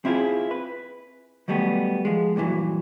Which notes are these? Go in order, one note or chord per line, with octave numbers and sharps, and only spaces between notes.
C4 E4 F4 G4 G#4
B4
D#3 F#3 G3 A3 B3
F3 G#3
G2 A#2 C#3 E3 F#3